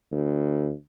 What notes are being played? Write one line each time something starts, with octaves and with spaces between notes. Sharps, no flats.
D2